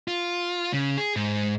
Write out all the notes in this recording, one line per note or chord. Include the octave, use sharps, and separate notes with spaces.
F4
C#3
G#4
G#2